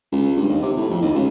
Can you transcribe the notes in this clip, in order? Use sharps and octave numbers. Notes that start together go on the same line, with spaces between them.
C#2
G2
D#2
C3
A2
F2
D#2
C#2